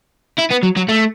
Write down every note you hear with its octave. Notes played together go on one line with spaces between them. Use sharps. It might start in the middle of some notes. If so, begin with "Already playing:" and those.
E4
B3
F#3
F#3
A3